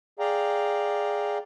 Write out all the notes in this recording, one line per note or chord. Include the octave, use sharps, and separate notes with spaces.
G#4 D5 F5 G5 A#5